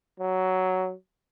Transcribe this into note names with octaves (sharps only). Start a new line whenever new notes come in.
F#3